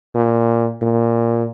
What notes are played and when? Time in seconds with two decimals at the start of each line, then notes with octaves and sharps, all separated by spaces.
0.14 A#2
0.82 A#2